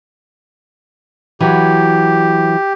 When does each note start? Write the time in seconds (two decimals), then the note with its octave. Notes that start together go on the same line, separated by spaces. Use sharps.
1.40 E3 F#3 G4